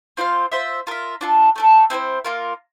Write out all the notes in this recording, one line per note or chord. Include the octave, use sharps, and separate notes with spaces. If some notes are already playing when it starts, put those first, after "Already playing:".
C4 F4 C5 F5
F4 C5 E5
F4 A#4 E5
D4 F4 A4
A3 D4 A4
C4 E4 A4 C5
A#3 F4 A#4